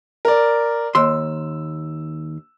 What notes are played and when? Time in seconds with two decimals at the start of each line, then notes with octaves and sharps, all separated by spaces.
0.25 A#4 D5
0.95 D#2 C6 E6